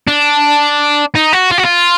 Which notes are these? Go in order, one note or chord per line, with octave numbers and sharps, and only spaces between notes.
D4
D#4
F#4
F4
F#4
F4